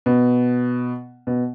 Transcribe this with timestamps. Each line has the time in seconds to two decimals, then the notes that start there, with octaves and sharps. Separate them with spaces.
0.06 B2
1.27 B2